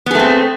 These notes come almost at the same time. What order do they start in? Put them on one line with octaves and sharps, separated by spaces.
B3 G#4 A3 C4